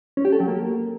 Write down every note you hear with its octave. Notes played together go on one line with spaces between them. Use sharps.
C#4
G4
A4
F#3
A#3